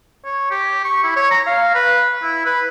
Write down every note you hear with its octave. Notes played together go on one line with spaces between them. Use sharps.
C#5
G4
C#6
E4
C#5
A#5
F5
B4
E4
B4